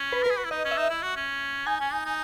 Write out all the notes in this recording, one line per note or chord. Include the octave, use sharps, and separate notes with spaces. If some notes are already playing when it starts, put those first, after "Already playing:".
Already playing: C#4
B4
A#4
G#4 B4
F#4
E4
D#4 D#5
C#4
E5
D#4
E4
F#4
C#4
D#4 G#5
C#4
D#4
D#4